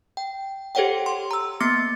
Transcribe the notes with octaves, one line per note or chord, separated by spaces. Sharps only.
G5
G4 A4 C5 C#5 F#5 G5
C6
A#5 E6
A#3 B3 D6 A6 A#6 C#7